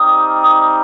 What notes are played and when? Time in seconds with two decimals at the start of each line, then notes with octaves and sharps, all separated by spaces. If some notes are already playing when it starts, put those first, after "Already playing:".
Already playing: G3 C4 D#4 D#6